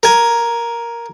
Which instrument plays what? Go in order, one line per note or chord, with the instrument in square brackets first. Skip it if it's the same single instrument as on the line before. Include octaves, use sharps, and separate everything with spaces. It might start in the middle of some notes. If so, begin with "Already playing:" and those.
[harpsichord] A#4 G#5